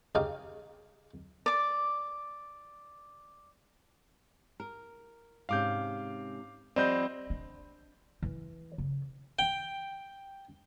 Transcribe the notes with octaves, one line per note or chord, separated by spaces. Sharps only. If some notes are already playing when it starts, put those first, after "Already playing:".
C#3 D#4 G4 F5
D5 D6
A#4
G#2 C3 C#4 F5 D6 G6
F3 G3 B3 C4 D5 D#5 B5 G6
D4
E3 E4
C#3
G5